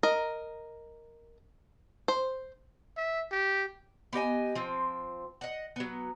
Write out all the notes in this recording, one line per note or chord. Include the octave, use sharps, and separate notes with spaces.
A#4 D#5
C5
E5
G4
B3 G4 D#5 G#5
F3 C4
D#5 F#5
F#3 B3